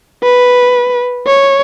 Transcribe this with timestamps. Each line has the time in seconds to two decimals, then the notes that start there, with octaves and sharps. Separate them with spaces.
0.23 B4
1.27 C#5